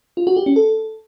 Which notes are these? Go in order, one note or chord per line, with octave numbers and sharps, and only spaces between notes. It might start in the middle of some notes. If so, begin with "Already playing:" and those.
F4
F#4
G4
C#4
A4